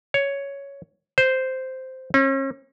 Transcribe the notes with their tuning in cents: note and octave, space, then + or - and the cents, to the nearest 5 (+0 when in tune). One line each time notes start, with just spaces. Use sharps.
C#5 +5
C5 -5
C#4 -40